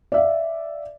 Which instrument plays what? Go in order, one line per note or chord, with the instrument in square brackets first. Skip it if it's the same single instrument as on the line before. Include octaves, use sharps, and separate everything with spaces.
[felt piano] D5 E5 F5